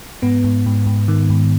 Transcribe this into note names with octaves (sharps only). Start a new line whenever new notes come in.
G#2 B3
G#2
G#2
G#2
D#3
G#2